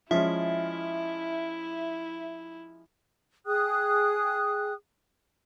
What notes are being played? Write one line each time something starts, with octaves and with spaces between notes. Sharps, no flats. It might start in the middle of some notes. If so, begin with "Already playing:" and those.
F3 G#3 C#4 E4 E5
G#4 G5 D#6 F#6